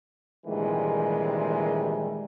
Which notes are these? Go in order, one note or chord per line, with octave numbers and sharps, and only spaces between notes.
A#1 C3 D#3 E3 G3 G#3